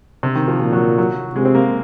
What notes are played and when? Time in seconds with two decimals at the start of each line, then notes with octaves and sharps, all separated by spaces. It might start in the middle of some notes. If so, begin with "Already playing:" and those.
0.23 C3
0.35 D#3
0.48 F3
0.60 A#2 F3
0.73 F#3
0.98 F#3
1.35 C3 G#3
1.45 C4
1.54 A#3